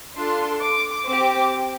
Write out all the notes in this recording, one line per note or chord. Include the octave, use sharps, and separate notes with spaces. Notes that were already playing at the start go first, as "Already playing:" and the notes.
D4 F4 A4 C6
D6
C4 G4 D6